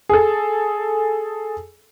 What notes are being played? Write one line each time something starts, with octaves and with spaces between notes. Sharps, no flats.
G#4 A4